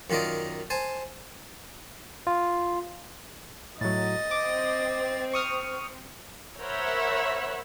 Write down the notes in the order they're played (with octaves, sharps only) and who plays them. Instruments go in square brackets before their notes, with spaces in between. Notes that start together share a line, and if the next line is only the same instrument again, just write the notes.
[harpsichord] F#2 D#3 F4 A#4 D5 D#5
C5 G#5 A5
[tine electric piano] F4
[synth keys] A2 F#3 [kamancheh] D#5 [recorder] A6
[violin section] C4 [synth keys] D6
[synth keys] C#6 D#6 F6
[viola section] A#4 C5 C#5 E5 F#5 B5